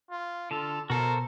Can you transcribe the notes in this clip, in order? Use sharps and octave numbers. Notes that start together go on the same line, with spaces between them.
F4
D3 F4 A4
B2 F#4 A4 A#4 C5